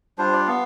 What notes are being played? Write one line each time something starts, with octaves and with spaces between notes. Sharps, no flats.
G3 D4 F4 C5
D5
B3 F5